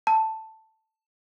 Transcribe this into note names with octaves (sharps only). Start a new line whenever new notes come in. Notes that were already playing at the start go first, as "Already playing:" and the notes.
A5